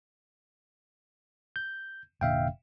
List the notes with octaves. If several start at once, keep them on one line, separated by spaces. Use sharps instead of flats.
G6
F1 A#2 D3 E5 F5 G5